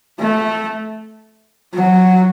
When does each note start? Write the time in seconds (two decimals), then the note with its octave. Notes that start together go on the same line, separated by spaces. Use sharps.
0.19 A3
1.74 F#3